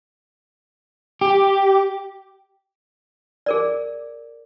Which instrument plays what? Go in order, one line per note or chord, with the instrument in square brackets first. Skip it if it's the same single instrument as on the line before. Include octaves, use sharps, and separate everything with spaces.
[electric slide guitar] G4
[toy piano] G#4 A#4 D5